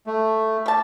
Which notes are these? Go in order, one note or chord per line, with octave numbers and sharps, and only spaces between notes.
A3
G3 A5